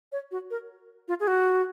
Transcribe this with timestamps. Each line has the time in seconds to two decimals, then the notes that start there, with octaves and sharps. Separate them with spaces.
0.12 C#5
0.31 F#4
0.50 A#4
1.08 F4
1.20 G#4
1.27 F#4